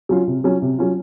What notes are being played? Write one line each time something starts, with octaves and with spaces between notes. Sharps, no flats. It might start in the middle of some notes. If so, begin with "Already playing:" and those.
F#3 C#4 F4
C3
F#3 C#4 F4
C3
F#3 C#4 F4